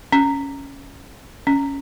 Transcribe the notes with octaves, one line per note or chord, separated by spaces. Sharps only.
C#4
C#4